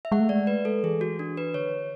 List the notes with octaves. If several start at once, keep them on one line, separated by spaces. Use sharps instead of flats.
E5
G#3 F#5
A3
G#3 D5
B4
A4
E3 G#4
F#4
D4
B4
D3 C#5